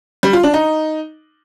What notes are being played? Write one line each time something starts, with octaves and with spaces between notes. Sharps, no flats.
G3
F4
D4
D#4